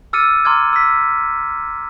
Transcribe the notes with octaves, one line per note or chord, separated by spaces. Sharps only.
D6 E6 F6 A6 C#7 D#7
A#5 C6 D6 F6 G#6
E6 B6